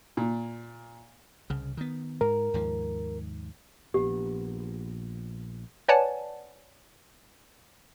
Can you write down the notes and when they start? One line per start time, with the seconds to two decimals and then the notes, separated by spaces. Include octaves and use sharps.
0.17 A#2
1.50 C2 C#3
1.77 D#3 B3
2.21 G#2 A#4
2.54 D#2 G#2 F3
3.94 A#1 B3 G4
5.88 B4 C#5 D5 F#5 G#5 A5